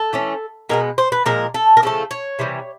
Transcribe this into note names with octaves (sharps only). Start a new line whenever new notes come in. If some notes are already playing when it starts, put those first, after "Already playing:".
Already playing: A4
E3 A3 C#4
B2 G#3 B3 A#4
C5
B4
A#2 F3 G#3 A#4
A4
A#4
C#3 F3 A3 A4
C#5
C3 E3 G3